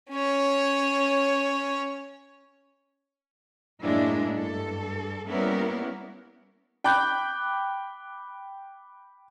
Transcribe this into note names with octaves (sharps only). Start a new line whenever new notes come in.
C#4 C#5
F#2 A2 G#3 A#3 D4 E4
G2 A4
G3 A#3 B3 C#4 E4 A#4
G5 B5 D6 F#6 G6